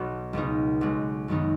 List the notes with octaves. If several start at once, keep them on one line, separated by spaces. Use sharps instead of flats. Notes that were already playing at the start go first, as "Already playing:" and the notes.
Already playing: B1 B2 B3
C#2 B2 B3 D#4
B1 B2 G#3
F#2 D#3 B3 D#4